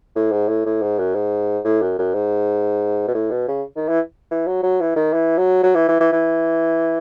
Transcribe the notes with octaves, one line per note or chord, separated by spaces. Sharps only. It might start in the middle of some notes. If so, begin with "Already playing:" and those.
A2
G#2
A2
A2
G#2
F#2
G#2
A2
F#2
F#2
G#2
B2
A2
B2
C#3
D#3
E3
E3
F#3
F#3
E3
D#3
E3
F#3
F#3
E3
E3
E3
E3